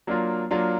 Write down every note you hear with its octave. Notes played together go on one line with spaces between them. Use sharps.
F#3 A#3 D4 F4
F#3 A#3 D4 F4